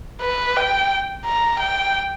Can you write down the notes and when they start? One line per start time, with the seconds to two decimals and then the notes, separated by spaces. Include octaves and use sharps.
0.21 B4
0.57 G5
1.26 A#5
1.60 G5